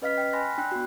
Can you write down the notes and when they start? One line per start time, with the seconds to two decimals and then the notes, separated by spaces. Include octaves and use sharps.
0.02 C#4 B4 D#5 F5 F6 B6
0.18 G5 F6 B6
0.33 F5 G#5 B5 C6 F#6 A#6
0.45 B5
0.58 D4 G5 F#6
0.72 B3 F#4